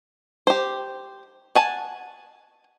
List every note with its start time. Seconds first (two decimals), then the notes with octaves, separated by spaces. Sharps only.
0.47 G4 C5
1.55 F#5 G#5 A5